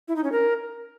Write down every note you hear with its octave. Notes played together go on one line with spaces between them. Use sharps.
E4
D#4
C#4
A#4